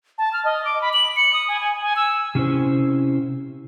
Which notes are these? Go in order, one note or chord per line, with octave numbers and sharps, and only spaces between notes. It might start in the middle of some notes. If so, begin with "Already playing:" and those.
A5
F6
D#5
D6
B5
F#7
C#7
D#6
G#5
G#5
G#5
E6
C3 C#4 E4 C5